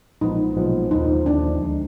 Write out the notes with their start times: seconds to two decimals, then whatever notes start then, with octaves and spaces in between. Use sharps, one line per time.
0.21 B1 A#2 F3 G#3 B3 D#4
0.56 B1 A#2 F3 G#3 B3
0.91 D#2 D3 F3 D#4
1.26 D#2 D3 F3 D4
1.60 D2 D3 G#3 D#4